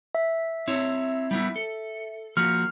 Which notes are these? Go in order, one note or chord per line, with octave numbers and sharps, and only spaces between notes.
E5
C4 E4 C#5
G3 B3 E4
A4
F3 A#3 F#4 F6